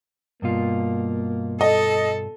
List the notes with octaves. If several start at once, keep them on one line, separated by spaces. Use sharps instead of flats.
G2 B2 A#3 F4
A4 D#5